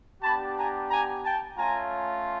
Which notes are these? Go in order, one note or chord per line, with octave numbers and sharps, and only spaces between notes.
B3 D4 G4 A5 B5
G#5 A#5
G#5 A#5
G5 A5
A3 C#4 F4 G#5 A#5